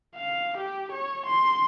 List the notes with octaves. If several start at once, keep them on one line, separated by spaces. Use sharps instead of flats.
F5
G4
C#5
C6